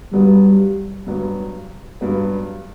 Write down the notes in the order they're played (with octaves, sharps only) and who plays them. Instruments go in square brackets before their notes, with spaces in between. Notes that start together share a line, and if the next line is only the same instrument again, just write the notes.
[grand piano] G2 F#3 B3 [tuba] G3
[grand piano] G2 F#3 B3
G2 F#3 B3